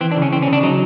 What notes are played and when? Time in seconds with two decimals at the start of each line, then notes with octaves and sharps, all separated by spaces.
0.01 E3 C4
0.12 D4
0.16 C#3
0.22 C#4
0.32 E3 C4
0.42 C#4
0.48 C#3
0.53 D4
0.63 F#3 D#4